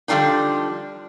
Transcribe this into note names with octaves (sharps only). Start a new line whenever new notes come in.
D3 F3 G3 D4 D#4